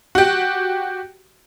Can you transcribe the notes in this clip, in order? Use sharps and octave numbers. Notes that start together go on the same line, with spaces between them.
F#4 G4